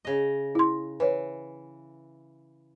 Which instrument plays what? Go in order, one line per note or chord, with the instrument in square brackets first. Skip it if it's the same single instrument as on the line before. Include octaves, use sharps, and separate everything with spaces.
[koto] C#3 D#5
[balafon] E4 C6
[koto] E3 [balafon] B4 C#5